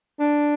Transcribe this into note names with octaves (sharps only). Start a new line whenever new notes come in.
D4